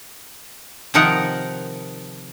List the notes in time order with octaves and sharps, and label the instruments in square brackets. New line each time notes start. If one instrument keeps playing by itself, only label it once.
[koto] C3 D#3 F3 D#4 A#4 F#5